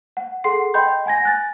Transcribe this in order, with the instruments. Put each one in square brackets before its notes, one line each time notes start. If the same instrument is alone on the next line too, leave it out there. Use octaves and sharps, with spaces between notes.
[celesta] F#5
G#4 A4 F#5 C6 C7
D#5 G5 B5 C6 G6
F#5 G#5 G#6 A#6
G#5 F#6 A6